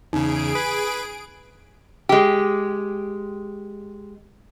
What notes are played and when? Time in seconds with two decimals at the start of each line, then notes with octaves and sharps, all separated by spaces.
0.13 E2 C#3 D#4 G#4 D7
0.55 B4 B6
2.09 G#3 G4